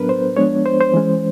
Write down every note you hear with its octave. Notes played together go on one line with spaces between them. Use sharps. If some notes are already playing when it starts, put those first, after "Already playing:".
Already playing: A2 F#3 B3 D4 A#4 B4
C5
F3 G#3 B3 D4 C#5
C5
C5
E3 G#3 C#4